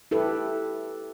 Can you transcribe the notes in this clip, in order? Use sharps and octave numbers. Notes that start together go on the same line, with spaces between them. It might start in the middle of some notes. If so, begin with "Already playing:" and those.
E4 G4 A4 B4